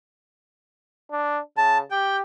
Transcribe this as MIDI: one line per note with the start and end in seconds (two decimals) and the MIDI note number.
1.11 1.40 62
1.57 1.82 49
1.57 1.78 81
1.91 2.22 67
1.91 2.16 79